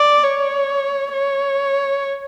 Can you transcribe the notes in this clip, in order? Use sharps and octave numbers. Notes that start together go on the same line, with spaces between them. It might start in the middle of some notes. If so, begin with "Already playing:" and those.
Already playing: D5
C#5
C#5